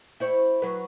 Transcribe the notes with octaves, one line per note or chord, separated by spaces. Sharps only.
E4 C5 C#5
F#3 B4